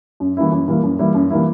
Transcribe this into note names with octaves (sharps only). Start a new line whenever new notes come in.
F#2
E3 G3 A#3 E4
F#2
E3 G3 A#3 E4
F#2
E3 G3 A#3 E4
F#2
E3 G3 A#3 E4